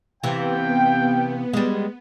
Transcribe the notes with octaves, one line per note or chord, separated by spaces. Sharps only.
C3 E3 B3 F5 G5
G3 G#3